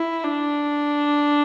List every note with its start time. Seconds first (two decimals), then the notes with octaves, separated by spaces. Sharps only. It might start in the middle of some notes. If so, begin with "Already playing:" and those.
Already playing: E4
0.24 D4